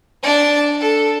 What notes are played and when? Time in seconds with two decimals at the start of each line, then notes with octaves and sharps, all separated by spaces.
0.23 D4 D5
0.81 A4